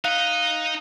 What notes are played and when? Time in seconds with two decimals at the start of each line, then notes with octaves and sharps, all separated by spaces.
0.04 D#4 D#5 F5 F#6